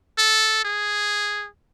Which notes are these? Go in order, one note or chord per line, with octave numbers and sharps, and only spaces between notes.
A4
G#4